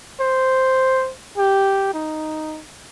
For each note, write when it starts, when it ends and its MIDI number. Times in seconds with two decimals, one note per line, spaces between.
0.20 1.11 72
1.38 1.93 67
1.94 2.61 63